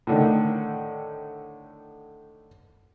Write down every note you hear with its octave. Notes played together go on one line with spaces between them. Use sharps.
A2 D3 D#3